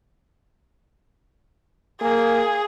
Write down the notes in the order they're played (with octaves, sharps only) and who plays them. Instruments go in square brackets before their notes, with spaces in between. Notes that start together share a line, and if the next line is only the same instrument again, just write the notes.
[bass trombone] A#3 [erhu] G#4